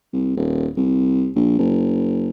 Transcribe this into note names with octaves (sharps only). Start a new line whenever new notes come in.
C2
D#1
C2
A#1
F#1